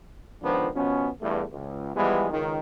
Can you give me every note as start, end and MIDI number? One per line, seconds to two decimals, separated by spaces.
0.42 0.67 37
0.42 0.67 51
0.42 0.67 53
0.42 0.67 59
0.42 0.67 62
0.42 0.67 72
0.75 1.09 47
0.75 1.09 53
0.75 1.09 59
0.75 1.09 61
1.21 1.43 40
1.21 1.43 43
1.21 1.43 57
1.52 1.93 37
1.95 2.29 52
1.95 2.29 53
1.95 2.29 55
1.95 2.29 56
1.95 2.29 59
2.30 2.59 37
2.30 2.59 51